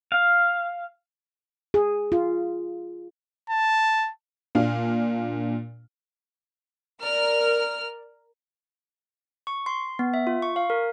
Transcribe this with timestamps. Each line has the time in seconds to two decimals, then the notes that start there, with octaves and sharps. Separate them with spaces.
0.12 F5
1.74 G#4
2.12 F4
3.50 A5
4.55 A#2 D4 F5
7.03 A#4 D5 F6
9.47 C#6
9.66 C6
9.99 B3
10.14 E5
10.27 F4
10.42 C#6
10.56 F5
10.70 A#4